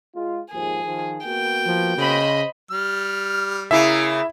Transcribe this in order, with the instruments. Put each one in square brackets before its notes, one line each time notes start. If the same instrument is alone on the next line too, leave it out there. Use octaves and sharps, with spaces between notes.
[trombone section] G#3 F4
[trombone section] D#2 G#2 F3 [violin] G#4
[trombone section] D#3 F3
[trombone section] A#3 B3 F#4 [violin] G5
[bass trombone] F3
[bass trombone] C#3 [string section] C5 D#5 B5
[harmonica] G3 F6
[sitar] C#3 A#3 [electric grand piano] E4 E5